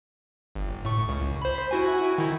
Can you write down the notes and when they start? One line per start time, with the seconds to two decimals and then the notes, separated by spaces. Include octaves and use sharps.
0.55 G1
0.85 A2 C#6
1.08 C#2
1.42 C5 B5
1.71 E4 F#4 G#5
2.18 D#3 E4